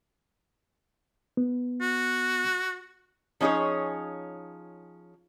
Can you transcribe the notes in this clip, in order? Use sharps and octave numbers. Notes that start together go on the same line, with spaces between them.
B3
F#4
F3 C#4 D#4 G#4 C#5